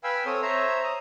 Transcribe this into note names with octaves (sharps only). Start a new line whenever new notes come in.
B4 F5 G5 G#5 B5 E6
C4 A4 C#5 D#6
C5 C#5 E5 A#5
D#6